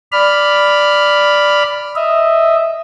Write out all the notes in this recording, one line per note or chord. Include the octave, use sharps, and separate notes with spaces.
D5 B5 F6
D#5 E5